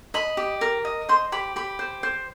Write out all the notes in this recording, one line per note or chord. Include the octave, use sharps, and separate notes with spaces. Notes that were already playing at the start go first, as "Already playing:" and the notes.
D#5 B5
G4
A#4
D#5
C5 C6
G4 B5
G4 B5
C5
C5